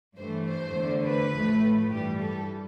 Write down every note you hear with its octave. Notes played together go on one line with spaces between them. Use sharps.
G2 E3 A3 C5
C5
E2 D3 A3
B4
A1 A2 F3 A3
G2 E3 G3 G4
A4